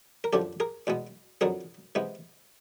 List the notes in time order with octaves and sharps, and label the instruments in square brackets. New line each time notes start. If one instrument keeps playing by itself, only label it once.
[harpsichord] A#4
F#2 D3 F3 G4 A4
G#4 A#4
E2 B2 G#3 B3
F2 D3 F#3 B3 G#4 A#4
C3 E3 G#3 B3